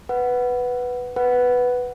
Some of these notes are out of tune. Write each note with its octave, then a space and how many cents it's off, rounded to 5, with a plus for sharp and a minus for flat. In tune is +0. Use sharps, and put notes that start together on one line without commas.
B4 +0 F#5 +0
B4 +0 F#5 +0